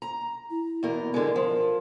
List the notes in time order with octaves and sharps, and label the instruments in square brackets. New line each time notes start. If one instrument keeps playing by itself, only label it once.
[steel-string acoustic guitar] A#5
[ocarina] E4
[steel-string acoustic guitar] E2 B2 A#4
[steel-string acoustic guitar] D3 G#3 [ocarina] A#4
[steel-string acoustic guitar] F3